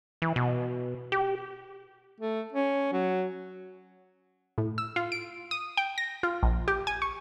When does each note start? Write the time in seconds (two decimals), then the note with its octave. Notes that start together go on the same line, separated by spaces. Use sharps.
0.22 E3
0.36 B2
1.12 G4
2.20 A3
2.53 C#4
2.93 F#3
4.58 A2
4.78 E6
4.96 F4
5.12 D7
5.51 D#6
5.77 G5
5.98 A#6
6.23 F4
6.43 A#1
6.68 G4
6.87 G#5
7.02 C#6